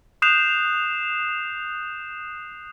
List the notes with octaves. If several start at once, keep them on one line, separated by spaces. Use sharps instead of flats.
D#6 F#6 G6 C7 E7 F7